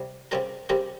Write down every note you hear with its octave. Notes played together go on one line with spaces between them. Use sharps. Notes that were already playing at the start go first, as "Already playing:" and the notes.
Already playing: C2 C3 G3
C#3 G3 C4 G4 A#4
C#3 G3 C4 G4 A#4